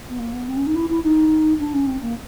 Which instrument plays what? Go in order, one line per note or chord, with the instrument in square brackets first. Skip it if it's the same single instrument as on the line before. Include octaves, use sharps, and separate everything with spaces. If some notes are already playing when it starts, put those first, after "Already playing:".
[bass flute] B3
A#3
B3
C4
C#4
D#4
E4
E4
D#4
D4
C#4
C4
A#3